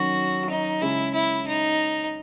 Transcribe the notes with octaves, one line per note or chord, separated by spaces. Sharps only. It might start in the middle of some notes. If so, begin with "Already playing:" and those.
Already playing: D#3 F#3 C#4 F#4
D#4
C#3 G#3 C#4 E4 G#4
E4
D#4